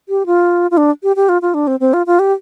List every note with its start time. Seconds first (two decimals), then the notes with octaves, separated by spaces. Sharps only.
0.09 G4
0.26 F4
0.71 F4
0.77 D4
1.03 G4
1.16 G4
1.29 F4
1.42 F4
1.54 D4
1.67 C4
1.80 C4
1.93 F4
2.07 F4
2.19 G4